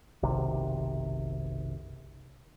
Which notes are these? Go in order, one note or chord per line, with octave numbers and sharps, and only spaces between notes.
F#1 B1 C3 D#3